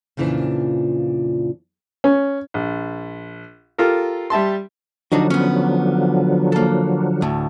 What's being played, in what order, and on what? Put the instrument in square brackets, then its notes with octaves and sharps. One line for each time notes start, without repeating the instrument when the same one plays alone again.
[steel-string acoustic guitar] F2 A#2 C#3 E3 F3 D4
[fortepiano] C#4
A#1
F4 G4 A4 A#4
G3 E5 A5 C6
[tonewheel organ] D3 F3 F#3 [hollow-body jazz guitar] D4 D#4 F#4
[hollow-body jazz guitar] B3 C#4
A#3 A4
D2 A2